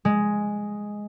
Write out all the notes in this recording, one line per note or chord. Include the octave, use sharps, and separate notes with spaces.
G#3